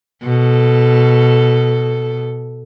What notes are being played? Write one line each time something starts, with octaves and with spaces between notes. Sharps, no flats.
B2 A4